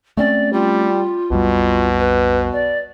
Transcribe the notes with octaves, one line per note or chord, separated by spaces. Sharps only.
A3 C4 C#4 D5
G3 F4
B1 F2 B2 G3
B4
D5